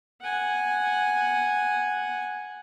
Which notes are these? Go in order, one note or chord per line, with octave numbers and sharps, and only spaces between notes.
F#5 G#5